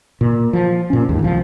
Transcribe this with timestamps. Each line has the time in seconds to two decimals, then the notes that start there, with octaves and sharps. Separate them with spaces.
0.21 A#2
0.53 F3
0.90 A#2 C#4
1.09 D#2 G#2
1.23 C2 F3